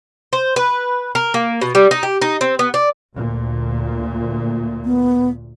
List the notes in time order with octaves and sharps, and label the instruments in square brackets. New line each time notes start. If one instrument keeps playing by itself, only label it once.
[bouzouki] C5
B4
A#4
A#3
B2
G3
D#4
G4
D#4
C4
B3
D5
[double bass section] D2 A#2
[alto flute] B3